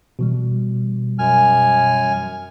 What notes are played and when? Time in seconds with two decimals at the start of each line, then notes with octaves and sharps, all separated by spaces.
0.19 B2 E3 G3
1.19 F#2 G#5 F6